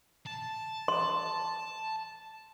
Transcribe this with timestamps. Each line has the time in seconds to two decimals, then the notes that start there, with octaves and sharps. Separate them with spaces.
0.26 A5
0.88 C6